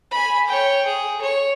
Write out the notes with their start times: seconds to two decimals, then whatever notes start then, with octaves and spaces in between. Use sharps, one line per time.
0.11 G#5 B5
0.47 C#5 G5
0.85 G#4
1.21 C#5